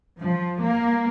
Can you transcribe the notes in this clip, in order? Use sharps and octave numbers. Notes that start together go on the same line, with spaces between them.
F3
A#3